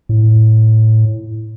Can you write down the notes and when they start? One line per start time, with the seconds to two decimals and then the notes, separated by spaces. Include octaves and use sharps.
0.09 A2